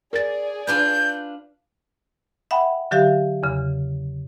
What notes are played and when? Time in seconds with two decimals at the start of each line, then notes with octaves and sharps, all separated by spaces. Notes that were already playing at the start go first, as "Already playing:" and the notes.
0.13 G#4 A#4 D5 A6
0.67 D4 F4 B4 G6
2.51 E5 F#5 G5 B5
2.91 D3 F#3 G4 E5 F5
3.43 E2 C#3